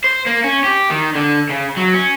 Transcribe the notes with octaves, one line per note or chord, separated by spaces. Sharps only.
C5
A#3
C#4
G4
D#3
D3
C#3
F#3
C#4